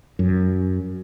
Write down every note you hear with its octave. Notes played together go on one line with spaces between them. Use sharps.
F#2